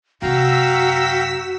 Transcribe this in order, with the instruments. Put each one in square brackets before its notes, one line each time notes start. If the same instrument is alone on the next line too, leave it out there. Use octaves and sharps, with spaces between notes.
[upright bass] F#2 C3 [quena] F#4 [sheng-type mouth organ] F5 G5 A#5 [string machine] E6 B6